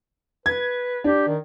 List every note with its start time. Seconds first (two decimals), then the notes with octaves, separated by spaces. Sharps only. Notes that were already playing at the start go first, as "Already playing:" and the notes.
0.46 B4 G#6
1.04 D4 G4
1.27 D#3